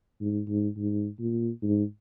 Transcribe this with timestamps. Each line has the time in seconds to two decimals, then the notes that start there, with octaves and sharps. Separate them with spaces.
0.21 G#2
0.49 G#2
0.77 G#2
1.20 A#2
1.63 G#2